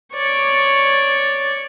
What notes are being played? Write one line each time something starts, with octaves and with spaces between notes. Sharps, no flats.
C#5 D5